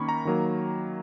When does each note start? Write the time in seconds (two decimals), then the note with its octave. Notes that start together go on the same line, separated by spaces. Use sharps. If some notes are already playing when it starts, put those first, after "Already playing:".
Already playing: D#3 A#3 C#4 B5 C#6
0.09 A#5
0.25 D#3 F#3 A#3